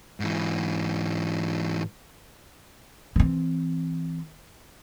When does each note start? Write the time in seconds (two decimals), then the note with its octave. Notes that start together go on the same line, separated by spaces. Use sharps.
0.20 G#2 E3
3.16 E3 C4